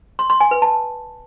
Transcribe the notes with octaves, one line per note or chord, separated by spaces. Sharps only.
C6
C6
G#5
B4
A5